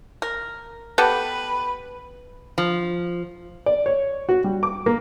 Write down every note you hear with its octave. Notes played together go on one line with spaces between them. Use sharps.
A#4
B3 G4 A4 B4
F3
D5
C#5
F#4
G3
D6
A#3